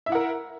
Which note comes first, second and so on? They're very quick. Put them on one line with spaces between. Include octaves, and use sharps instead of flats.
E5 E4 F#5 A#4